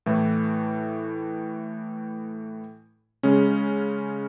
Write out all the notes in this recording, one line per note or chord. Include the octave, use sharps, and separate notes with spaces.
A2 E3 A3
C#3 G#3 C#4